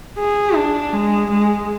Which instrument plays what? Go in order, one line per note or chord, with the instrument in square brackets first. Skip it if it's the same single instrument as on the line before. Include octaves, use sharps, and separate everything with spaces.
[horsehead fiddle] G#4
D4
G#3
G#3